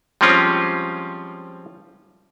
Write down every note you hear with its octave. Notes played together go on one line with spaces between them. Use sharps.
F3 G3 G#3 C4 C#4 F4